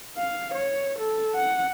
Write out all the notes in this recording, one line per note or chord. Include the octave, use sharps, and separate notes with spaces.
F5
C#5
A4
F#5